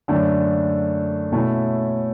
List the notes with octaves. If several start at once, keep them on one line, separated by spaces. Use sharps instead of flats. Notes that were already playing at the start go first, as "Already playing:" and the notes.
F#2 D3 A3 D4
B2 A3 C#4 E4